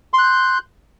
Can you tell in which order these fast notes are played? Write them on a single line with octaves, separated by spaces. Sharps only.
C6 F#6 G6